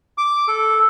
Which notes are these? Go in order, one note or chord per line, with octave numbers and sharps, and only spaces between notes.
D6
A4